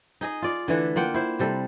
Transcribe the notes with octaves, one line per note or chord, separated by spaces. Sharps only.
D#4 G#4 D#5
F4 D5
D3 E3 A3
A#3 F4 F#5 G5
E4 C5
C3 G3 A4